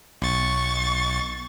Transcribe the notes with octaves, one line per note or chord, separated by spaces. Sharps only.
B1 C#6 A6